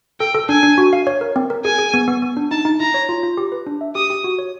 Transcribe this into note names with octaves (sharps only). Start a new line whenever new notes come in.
A4 G5
A4
D4 G#5
D4
F#4
F5
C#5
A#4
C4
A#4
G#4 G#5
G#4
B3
B3
B3
D4
D#4 A5
D#4
E4 A#5
C#5
F4
F4
G4
B4
D4
E5
G4 D#6
G4
F#4
C#5